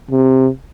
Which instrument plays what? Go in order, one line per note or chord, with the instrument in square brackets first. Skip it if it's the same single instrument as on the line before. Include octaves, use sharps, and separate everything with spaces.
[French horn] C3